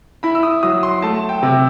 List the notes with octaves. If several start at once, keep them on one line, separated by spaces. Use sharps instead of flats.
E4 B5
E6
D#6
F#3 D#6
C6
A3 A5
G5
C3